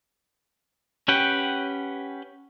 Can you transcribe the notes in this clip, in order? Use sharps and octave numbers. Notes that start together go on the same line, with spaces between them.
C#4 G4 B4 F#5 G5